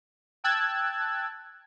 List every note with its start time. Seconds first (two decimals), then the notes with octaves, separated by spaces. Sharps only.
0.44 G5 A5 E6 F#6 G#6 A6